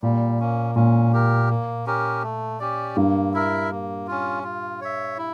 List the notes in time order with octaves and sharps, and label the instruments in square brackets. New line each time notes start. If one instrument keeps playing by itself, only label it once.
[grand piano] A#2 [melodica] G3
[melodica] A#3 C#4
[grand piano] A#2 [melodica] C#4
[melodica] G4 A#4
A#3
C#4 G4 A#4
A3
C#4 G4 D5
[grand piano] G2 [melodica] A#3
[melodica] E4 A#4 E5
A#3
C#4 F4
F4
C#5 E5
E4